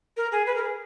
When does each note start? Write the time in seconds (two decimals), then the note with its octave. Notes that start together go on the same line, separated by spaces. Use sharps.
0.17 A#4
0.32 G#4
0.46 B4
0.55 A#4
0.63 G#4